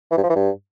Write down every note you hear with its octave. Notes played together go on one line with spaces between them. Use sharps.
E3
G2
F3
E3
G2